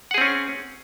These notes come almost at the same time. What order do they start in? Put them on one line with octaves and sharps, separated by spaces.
F#5 G#4 C4 C#4